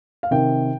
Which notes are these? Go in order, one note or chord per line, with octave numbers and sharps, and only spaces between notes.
F5
C3 D#3 G5